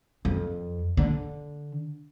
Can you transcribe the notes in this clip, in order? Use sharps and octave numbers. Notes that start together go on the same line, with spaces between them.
F2
D3